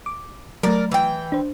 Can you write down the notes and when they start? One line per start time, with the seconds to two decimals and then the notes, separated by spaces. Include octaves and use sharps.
0.06 D6
0.63 F#3 A3 A#4 D5
0.91 E3 G5
1.32 D4 C5